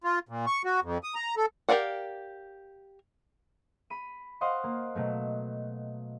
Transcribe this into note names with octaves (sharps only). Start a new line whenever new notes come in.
F4
A#2
C#6
F#4
F2
D#6
A#5
A4
G4 A#4 D5 F5 F#5
B5 D#7
C5 D#5 F5 F#5 C6 C#6
A#3
B2 F#3 A3